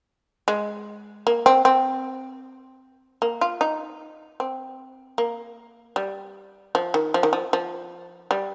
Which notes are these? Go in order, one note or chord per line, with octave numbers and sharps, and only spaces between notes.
G#3
A#3
C4
C4
A#3
F4
D#4
C4
A#3
G3
F3
D#3
F3
D#3
F3
F3
G3